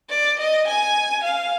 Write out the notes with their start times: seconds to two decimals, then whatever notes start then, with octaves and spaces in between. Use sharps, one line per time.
0.10 D5
0.39 D#5
0.67 G#5
1.24 F5